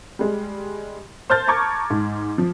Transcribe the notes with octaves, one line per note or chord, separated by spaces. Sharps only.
G3 G#3
C5 A5 F6 G6 A6
A5 A#5 C#6 D6 G#6
G#2
F3